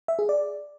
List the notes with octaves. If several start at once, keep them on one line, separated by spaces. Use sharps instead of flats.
E5
G#4
D5